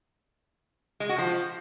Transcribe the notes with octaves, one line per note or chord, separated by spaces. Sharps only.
G#3
F#4
F3